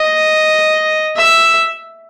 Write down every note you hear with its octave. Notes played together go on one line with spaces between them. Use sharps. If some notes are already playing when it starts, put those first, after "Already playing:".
Already playing: D#5
E5